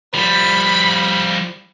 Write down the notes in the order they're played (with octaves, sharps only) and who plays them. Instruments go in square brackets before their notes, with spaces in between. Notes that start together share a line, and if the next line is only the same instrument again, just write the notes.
[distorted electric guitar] F3 G3 [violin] B5